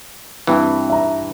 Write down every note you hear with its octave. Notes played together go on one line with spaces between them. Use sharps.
G2 E3 C4
E5 A#5